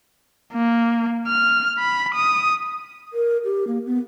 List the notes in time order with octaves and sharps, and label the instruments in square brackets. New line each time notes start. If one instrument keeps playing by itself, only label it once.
[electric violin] A#3
F6
B5
D#6
[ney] A#4
G4
A#3
B3